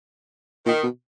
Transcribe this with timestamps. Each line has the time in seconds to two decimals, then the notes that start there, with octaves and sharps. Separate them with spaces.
0.66 A#2 D#3
0.83 B2